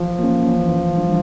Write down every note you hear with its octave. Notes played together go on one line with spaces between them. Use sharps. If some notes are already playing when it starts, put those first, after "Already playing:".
Already playing: E3 F3
A#3 C#4
E3
G3 D4